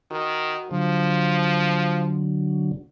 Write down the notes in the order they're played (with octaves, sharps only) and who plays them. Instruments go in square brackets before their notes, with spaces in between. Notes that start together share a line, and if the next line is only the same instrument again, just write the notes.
[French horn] D#3 [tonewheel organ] F#4
[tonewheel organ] D3 F#3 [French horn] F3